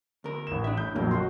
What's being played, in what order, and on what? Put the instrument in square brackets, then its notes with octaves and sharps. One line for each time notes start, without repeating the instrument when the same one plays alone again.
[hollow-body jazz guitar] D2 A#4
[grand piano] A1 E7
[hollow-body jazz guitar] D4 E5
[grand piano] A2 G6
[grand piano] A#1 F2 F#3 [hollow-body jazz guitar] A#3
[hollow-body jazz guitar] C#2 G2 [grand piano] F#4 D#5 C6